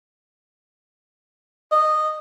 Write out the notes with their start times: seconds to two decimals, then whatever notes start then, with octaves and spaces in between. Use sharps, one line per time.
1.72 D#5